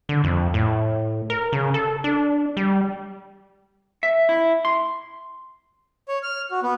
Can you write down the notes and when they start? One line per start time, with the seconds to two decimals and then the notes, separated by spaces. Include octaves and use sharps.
0.09 D3
0.24 F2
0.54 A2
1.30 A#4
1.52 C#3
1.74 A4
2.04 D4
2.57 G3
4.03 E5
4.29 E4
4.65 C6
6.08 C#5
6.23 F6
6.51 F#4
6.63 B3